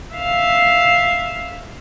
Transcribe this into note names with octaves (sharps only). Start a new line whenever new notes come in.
E5 F5